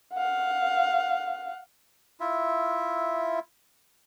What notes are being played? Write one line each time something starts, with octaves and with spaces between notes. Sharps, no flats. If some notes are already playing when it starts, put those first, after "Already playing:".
F5 F#5
E4 F4 E5